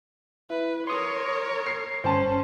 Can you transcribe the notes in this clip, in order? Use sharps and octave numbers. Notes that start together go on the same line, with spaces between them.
E4 B4
A#4 C#5 C6 D#6
C7
G1 C#4 C5 A5 C6